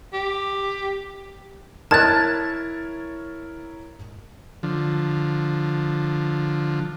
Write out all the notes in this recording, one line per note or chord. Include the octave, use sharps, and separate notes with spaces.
G4
E4 A#4 C#5 A5 F6 F#6 G#6 A6
D3 F3